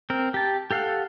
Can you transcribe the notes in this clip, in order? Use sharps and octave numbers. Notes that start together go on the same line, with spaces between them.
C4 A#4
G4 A5
G4 A4 F5 F#5